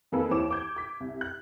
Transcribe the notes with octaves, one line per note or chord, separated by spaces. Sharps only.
F2 D#3 A#3 G#4 A4 B4
D#2 E3 C5 C#5 D6 E7
D6 G6 G#6
D6 B6
C2
F#6